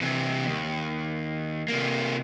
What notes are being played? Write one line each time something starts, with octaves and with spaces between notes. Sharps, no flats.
C3 E3
D#2
C3 A#3